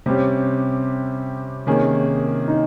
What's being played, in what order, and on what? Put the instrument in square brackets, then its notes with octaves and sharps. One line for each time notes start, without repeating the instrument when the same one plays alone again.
[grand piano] C3 G3 C#4 G4 [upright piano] C4
[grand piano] C3 D#3 A#3 C#4 G#4
[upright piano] D#4